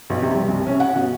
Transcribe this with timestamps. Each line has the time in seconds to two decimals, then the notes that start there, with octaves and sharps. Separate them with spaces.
0.10 B1
0.22 C3
0.35 G3
0.48 C2
0.67 C#4
0.80 F#5
0.96 B2